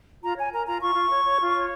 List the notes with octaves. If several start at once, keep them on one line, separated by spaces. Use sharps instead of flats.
F4 A#5
C#5 G#5
A#4 A#5
F4 A#5
F4 C#6
F4
C#5
C#5
F4
C#5